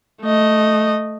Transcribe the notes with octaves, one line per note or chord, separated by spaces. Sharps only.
A3 D#5